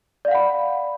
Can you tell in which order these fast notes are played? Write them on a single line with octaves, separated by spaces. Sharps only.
D5 F5 F#5 B5